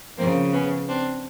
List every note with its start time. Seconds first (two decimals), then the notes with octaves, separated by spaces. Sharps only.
0.17 C#3 F3 A#3 C4
0.52 B3 C#4
0.88 C4 D4